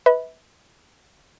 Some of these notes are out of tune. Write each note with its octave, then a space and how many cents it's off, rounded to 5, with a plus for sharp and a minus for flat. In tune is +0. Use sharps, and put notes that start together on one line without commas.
B4 +0 E5 -35 B5 +0